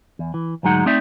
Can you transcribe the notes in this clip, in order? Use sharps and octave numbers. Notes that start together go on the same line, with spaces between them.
E2
E3
D2 G#2 F#3 G#3 D#4 F#5
A3 C4 D#4 D5 E5